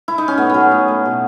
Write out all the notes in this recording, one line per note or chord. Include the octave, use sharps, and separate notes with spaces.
E4
D#4
C#4
A2 B3
F#3 B3
A2
A3
B2